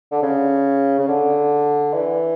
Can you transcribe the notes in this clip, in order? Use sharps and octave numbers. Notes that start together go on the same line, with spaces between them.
D3
C#3
C#3
D3
E3